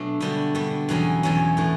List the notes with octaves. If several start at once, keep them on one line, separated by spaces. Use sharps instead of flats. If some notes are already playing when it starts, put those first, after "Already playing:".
Already playing: B2 F#3 A3 D4
D3 G3 B3 F#4
D3 G3 B3 F#4
E2 B2 F#3 C#4
E2 B2 F#3 C#4
A2 E3 A3